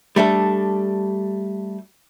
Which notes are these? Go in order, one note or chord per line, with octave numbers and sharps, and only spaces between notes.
G3 A3 D4 A4